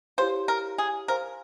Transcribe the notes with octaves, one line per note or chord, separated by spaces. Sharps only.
E4 G4 C5 C#5 F5
A#4
G#4
A#4 C5 F5 G#5 C6